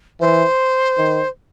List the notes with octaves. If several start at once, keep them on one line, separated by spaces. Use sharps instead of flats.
E3 C5
D#3